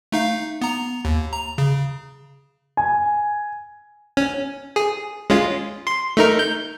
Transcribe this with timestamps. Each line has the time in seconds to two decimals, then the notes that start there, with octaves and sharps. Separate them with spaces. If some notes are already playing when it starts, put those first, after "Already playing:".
0.12 A3 D#4 F5
0.61 B3 A#5
1.05 D#2
1.32 A#5
1.58 C#3
2.77 G#5
4.17 C#4
4.76 G#4
5.30 G#3 C#4 F4
5.87 C6
6.17 A3 D#4 A#4
6.39 G6